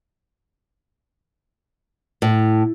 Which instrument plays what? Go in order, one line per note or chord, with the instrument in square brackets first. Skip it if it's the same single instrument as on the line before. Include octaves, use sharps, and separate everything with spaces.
[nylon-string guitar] A2